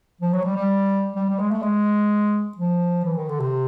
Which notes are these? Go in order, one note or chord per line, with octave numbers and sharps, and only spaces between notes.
F3
F#3
G3
G3
G3
G3
G#3
A3
G#3
F3
E3
D#3
D3
C3